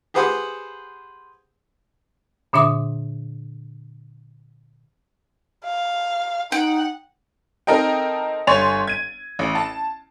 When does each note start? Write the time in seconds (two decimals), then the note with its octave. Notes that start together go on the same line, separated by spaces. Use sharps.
0.14 G4 G#4 B4 C5 F#5 D#6
2.53 A#2 D3 D4 E5 D6 D#6
5.65 F5
6.52 D#4 F#5 G5
7.67 C4 D#4 A4 A#4 D#5 G5
8.47 G1 C#5 G#5 C6 A6 F7
8.87 G#6 D#7
9.39 A1
9.55 A5